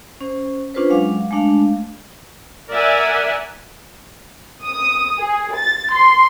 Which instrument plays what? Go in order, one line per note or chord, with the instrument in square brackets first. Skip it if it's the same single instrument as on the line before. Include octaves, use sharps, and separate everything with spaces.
[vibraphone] C#4 C5
C#4 D4 F4 G#4 B4 C5
F#3 G#3 F5 D6
G#3 A3 D4 F5
[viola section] A#4 D5 E5 F#5 G#5
[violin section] D#6
G#4
A6
C6